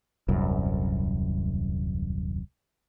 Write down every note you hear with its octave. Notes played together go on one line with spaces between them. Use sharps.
D#1 C2 F#2